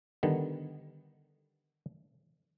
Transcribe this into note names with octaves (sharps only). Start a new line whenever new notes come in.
D3 D#3 G3 B3